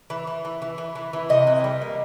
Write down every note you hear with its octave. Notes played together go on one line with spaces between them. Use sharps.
E3
E3
E3
E3
E3
E3
E3
C3 D#5
E3
G3
A#3